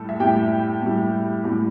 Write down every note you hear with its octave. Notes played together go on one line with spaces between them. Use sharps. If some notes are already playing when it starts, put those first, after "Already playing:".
Already playing: A2 G3 A4
E5
A2 G3 G4 G5
A2 G3
A2 G3